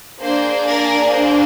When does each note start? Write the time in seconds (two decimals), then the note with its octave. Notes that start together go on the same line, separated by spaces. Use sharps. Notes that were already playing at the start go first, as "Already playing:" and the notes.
0.20 A#3 D4 G#4 C5
0.67 A#4 D5
1.12 C5